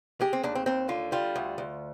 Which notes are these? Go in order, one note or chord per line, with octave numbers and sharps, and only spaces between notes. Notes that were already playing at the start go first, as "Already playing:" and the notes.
G#3 G4
C4
D#2 D4
C4
D#2 C4
D3 F4
G3 F4
D2
D2